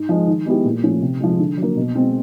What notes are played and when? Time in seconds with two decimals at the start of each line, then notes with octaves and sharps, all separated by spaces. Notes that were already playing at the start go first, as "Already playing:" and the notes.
Already playing: G#2
0.09 F3 G#3
0.27 D#3
0.46 G#3 B3 E4 G4
0.65 A#2
0.84 F3 A3 C#4
1.01 C3
1.20 F3 G#3
1.39 D3
1.57 F#3 A#3
1.77 B2
1.95 G#3 C4